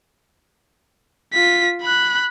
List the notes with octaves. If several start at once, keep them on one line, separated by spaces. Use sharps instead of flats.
F4 B6
B5 F#6